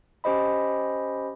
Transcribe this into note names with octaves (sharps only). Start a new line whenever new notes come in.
C#4 G4 C5 D#5 B5